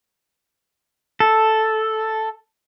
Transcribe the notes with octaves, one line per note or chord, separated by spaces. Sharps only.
A4